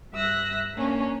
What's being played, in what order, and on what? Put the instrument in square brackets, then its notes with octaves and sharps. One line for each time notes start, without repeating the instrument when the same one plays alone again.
[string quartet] G2 E5 E6 F#6 A#6
A#3 C#4 D4